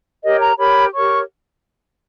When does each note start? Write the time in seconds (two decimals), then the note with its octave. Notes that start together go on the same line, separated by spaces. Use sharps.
0.23 G4 A#4 C#5 D#5
0.41 A#5
0.58 G4 A#4 C#5 B5
0.94 G4 A#4 C#5 C#6